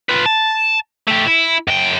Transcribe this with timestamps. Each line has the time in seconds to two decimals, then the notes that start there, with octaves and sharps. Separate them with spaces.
0.09 F4 B4
0.26 A5
1.08 A3 G4
1.26 E4
1.68 F#2 G5